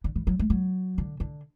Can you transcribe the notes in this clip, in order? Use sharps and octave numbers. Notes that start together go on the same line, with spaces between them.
D3
E3
F#3
A3
F#3
D3
D3